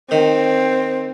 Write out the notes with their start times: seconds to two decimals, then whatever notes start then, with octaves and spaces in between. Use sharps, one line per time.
0.11 D#3 C4